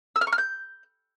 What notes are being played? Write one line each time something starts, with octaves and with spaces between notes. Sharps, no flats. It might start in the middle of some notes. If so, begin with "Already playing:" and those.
E6
F6
C#6
F6
G6